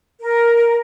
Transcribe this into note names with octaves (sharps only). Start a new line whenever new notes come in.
A#4